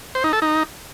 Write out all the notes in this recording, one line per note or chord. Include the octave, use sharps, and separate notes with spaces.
C5
D#4
A4
D#4